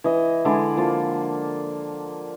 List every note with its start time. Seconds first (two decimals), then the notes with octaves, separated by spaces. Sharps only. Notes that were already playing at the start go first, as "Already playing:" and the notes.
0.04 E3 D#5
0.45 D3 G#3 E4 D5
0.77 F3 A#3 F4